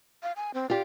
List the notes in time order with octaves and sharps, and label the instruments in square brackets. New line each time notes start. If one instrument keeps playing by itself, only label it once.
[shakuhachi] F5
G#5
C4
[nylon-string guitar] F4 G4 [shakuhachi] D5